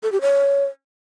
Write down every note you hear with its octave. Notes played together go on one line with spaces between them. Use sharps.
A4
G4
C#5